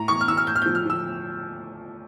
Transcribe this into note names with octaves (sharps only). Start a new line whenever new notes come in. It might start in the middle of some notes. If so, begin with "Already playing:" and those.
Already playing: A2 A#5
E3 C#6
F6
E3 E6
F6
A2 G6
F6
F3 G6
F6
F3 E6